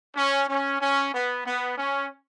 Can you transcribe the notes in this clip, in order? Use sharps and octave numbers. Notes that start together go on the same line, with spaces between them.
C#4
C#4
C#4
B3
B3
C#4